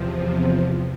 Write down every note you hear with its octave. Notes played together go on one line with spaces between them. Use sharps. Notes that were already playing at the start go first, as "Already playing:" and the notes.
Already playing: E2 C3 F3